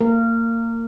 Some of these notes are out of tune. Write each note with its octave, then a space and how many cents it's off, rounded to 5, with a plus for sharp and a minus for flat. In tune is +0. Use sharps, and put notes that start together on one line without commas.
A#3 -25 A#4 -20